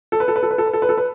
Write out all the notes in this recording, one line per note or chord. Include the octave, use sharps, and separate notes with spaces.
A4
B4
A4
B4
A4
B4
A4
B4
A4
B4
A4
B4